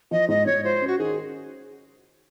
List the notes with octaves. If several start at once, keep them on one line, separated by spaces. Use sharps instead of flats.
F3 D#5
G#2 D#5
G#2 C#5
F4 C5
C#4
F#4
D#3 G#4